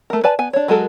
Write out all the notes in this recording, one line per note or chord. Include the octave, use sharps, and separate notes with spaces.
A3 A#4
B4 D5 G#5 A5
B3 G#5
D4 C#5
F#3 G#3 F#4 A4 A#4